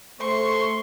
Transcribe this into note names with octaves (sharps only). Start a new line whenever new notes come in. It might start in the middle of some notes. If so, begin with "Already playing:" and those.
A3 C5 C6 C#6